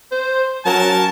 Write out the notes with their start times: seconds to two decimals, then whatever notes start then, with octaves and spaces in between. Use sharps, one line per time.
0.12 C5
0.66 F#3 C#4 A#4 A5